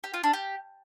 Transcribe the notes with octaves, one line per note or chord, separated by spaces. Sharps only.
G4
F4
D4
G4